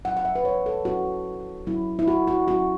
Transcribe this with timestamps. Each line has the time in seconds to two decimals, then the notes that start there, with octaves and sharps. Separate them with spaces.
0.05 F#3 C#4 E4 F#5
0.17 F#5
0.25 E5
0.35 B4
0.45 C#5
0.66 A4
0.85 F#3 C#4 E4 F#4
1.67 F#3 C#4 E4
1.99 E4
2.08 F#4
2.27 F#4
2.48 F#3 C#4 E4 F#4